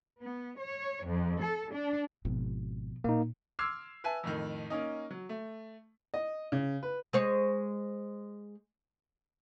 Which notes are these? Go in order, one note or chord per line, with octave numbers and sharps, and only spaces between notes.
B3
C#5
F2
A4
D4
G#1 B2 F3
A#2 A#3 D#4
C6 D6 E6 F6 G#6 C7
B4 E5 G#5 A5
F2 A2 D#3
A#3 C#4 D#4
F#3
A3
D#5
C#3
B4
G#3 C5 C#5